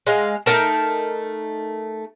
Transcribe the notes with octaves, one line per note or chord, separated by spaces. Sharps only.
G#3 D#5 F5
A3 D#4 A#4 A5